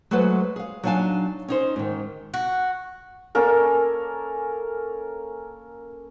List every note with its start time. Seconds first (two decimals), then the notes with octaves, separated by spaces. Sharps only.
0.11 F#3 G#3 A3 F#4 B4 C5
0.56 G#4 F5
0.83 F#3 D4 D#4 F5 G#5 A5
1.48 C#4 D#4 C5
1.76 G#2 D#3
2.34 F#4
3.35 A#3 C#4 A4 A#4